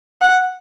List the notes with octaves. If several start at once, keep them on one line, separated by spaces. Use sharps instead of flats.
F#5